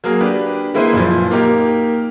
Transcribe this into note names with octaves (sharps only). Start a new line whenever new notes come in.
F#3 A#3 G#4 A#4
D4 G4 B4
G#3 A#3 E4 B4 C5 D#5
F#1 A#2 F3
A#3 D#4 G4 A#4